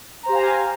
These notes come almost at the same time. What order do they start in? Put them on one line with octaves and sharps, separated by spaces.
A#5 C5 G4 F5 G#5